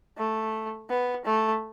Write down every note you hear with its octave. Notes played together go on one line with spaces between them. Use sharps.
A3
B3
A3